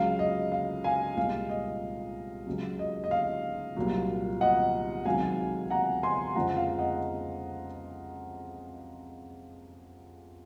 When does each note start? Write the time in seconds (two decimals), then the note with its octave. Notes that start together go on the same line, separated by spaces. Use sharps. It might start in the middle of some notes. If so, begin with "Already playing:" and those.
Already playing: C#2 C#3 F#3 F5
0.19 D#5
0.52 F5
0.84 F5 G#5
1.17 C2 A#2 G#3 F5
1.49 D#5
2.46 C#2 C#3 F#3
2.79 D#5
3.04 D#5
3.11 F5
3.76 C2 A#2 F#3
4.41 D#5 F#5
5.06 C#2 C3 D#3 F#3 F5 G#5
5.70 F#5 A#5
6.03 G#5 C6
6.35 F2 C#3 F3 G#3 F#5 A#5
6.57 F5
6.78 D#5 F#5